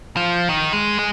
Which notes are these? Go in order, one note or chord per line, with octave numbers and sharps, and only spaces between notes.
F3
D#3
G#3
G#3